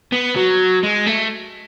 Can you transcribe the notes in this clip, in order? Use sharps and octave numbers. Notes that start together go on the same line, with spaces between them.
B3
F#3
G#3
A3